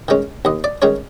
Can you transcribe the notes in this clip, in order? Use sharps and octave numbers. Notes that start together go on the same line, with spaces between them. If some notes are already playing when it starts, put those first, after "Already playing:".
D#3 G#3 C#4
D#2 D#5
D5
D#3 G#3 C#4 C#5